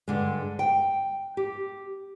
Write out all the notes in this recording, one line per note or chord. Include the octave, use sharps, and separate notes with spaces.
G2 D3 G#3
G5
G4